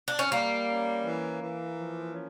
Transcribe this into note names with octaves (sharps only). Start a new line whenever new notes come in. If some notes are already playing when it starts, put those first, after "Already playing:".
D4
C#4
G3 A#3
C#4
E3
E3
F3
C#4